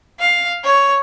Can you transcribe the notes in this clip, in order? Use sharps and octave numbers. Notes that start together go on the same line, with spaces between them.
F5
C#5